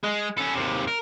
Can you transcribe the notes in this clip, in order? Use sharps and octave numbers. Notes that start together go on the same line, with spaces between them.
G#3
C#4 A4
D#2 C3
A#4